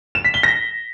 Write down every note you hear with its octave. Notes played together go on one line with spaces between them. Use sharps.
E7
B6
G7
A#6